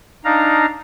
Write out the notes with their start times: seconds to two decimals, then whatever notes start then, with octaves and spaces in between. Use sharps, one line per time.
0.25 D4 D#4 F5 A#5